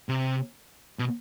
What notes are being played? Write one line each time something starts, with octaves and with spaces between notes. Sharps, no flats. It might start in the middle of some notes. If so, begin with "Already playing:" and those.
C3
B2